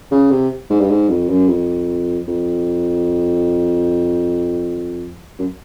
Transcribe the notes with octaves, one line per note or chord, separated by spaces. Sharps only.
C#3
C3
G#2
G2
G#2
F2
F#2
F2
F2
F#2